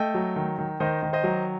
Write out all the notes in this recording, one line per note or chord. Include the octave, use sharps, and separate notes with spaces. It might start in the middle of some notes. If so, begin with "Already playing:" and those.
Already playing: A3 D#5 G5
F#3
D#3
D#3
D#3 C5 D#5
D#3
C5 D#5
F#3